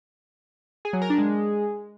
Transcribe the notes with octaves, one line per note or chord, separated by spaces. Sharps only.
G#4
F#3
A#4
D4
G#3